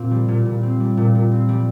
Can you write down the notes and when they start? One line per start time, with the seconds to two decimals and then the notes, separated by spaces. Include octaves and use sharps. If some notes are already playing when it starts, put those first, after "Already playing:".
Already playing: A#2 C4
0.11 G3
0.28 A#2
0.45 A#2
0.63 C4
0.80 G3
0.97 A#2
1.15 A#2
1.32 C4
1.49 G3